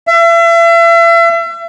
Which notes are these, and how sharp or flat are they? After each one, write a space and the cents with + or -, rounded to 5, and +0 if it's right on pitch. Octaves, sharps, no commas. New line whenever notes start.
E5 +35